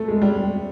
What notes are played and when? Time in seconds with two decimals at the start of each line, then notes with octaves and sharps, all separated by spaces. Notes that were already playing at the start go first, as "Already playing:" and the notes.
Already playing: A3
0.08 G#3
0.22 G3